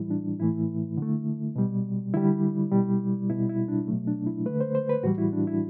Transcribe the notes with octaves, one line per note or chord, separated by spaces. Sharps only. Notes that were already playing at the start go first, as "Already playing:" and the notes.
Already playing: A2 E3 G3 E4
D4
A2 E3 A3 E4
D3 A3
B2 G3
D3 G3 E4
B2 G3
B2 G3 E4
E4
D4
B2 F#3 A3
D4
E4
D3 A3 B4
C5
C5
B4
A2 E3 G3 F#4
E4
D4
E4